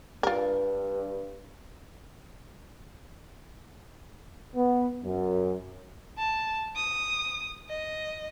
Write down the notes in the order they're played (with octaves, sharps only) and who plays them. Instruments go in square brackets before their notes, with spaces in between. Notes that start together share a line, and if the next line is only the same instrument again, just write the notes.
[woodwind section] G2 [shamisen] F4 A#4
[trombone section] B3
F#2
[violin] A5
D#6
D#5